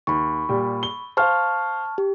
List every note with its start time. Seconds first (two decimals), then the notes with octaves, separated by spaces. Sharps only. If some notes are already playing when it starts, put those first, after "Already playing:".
0.07 D#2 B5 C#6
0.49 A#2 G3 G4
0.83 G7
1.17 C5 F5 A5 C#6 F6
1.98 G4